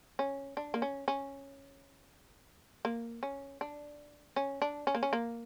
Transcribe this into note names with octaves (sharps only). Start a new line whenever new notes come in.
C#4
D4
A#3
C#4
C#4
A#3
C#4
D4
C#4
D4
C#4
A#3
C#4
A#3